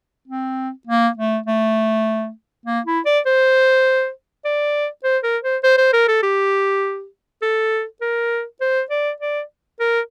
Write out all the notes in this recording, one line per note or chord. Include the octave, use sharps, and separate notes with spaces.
C4
A#3
A3
A3
A#3
E4
D5
C5
D5
C5
A#4
C5
C5
C5
A#4
A4
G4
A4
A#4
C5
D5
D5
A#4